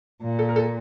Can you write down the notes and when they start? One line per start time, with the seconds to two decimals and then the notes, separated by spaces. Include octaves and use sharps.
0.23 A#2
0.39 A4
0.49 A#4
0.56 A4